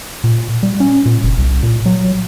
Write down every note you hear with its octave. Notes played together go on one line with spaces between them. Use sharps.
A#2
G3
C#4
A#2
F#1
C2
A#2
F#3